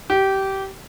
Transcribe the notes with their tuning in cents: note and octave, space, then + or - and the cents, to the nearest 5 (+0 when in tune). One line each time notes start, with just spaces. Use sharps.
G4 -20